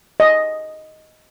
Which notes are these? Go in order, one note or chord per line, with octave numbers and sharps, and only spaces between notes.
D#5